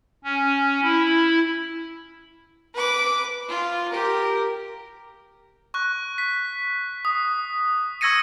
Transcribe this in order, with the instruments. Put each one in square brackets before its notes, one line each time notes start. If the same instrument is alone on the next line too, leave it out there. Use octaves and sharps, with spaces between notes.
[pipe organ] C#4
E4
[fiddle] B4 D6
F4
G4 A#4
[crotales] C#6 F#6
B6
D#6
C#6 E6 G#6 A#6 C#7 D#7